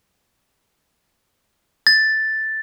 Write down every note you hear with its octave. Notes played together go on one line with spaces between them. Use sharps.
A6